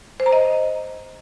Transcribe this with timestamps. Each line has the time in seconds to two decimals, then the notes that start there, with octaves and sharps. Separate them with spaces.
0.20 C5
0.26 A#5
0.33 D#5